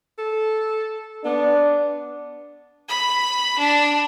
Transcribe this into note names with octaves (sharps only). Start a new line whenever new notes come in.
A4
B3 D4
B5
D4